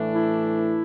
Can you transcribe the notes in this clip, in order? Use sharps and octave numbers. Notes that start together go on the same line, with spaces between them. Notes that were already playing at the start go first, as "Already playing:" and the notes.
Already playing: A2 E3 A3 D4
E4